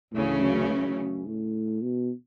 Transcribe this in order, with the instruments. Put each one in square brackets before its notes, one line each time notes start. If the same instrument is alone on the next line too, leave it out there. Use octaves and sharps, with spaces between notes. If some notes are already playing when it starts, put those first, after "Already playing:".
[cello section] D2 C#3 E3 A3 C#4 [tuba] A2
[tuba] F#2
F#2
A2
B2